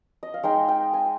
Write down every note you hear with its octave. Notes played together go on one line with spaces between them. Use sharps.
D#5
F5
G#3 D#4 G5
G5
G#5